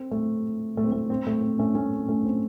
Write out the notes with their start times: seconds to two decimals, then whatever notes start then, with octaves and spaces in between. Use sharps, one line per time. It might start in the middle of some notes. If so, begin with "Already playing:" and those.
Already playing: C4
0.11 A3
0.77 A3
0.84 C4
0.92 A3
1.10 C4
1.27 A3
1.42 C4
1.58 A3 C#4
1.75 A3 C#4
2.08 A3 C#4
2.25 C4